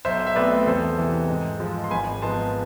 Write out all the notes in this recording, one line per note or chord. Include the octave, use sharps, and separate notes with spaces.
B1 C5 E5
E5
B2 A3 C4 B4 D5
E2 A4 C5
C3 E3
G#2
F3 G#3
C6
G#1 G#5 B5
G#2 F3 B3 A5 C6